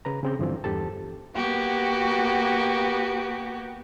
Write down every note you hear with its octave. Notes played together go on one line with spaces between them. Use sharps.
C#3 B4 A#5
C#3 C4 G6
G2 D3 E3 F3 C4
E2 G2 G4 A4 A5
A#3 B3 F#4 G4